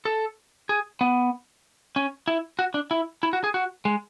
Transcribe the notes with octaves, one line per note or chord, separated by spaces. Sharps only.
A4
G#4
B3
C#4
E4
F#4
D4
E4
E4
F#4
G#4
F#4
G#3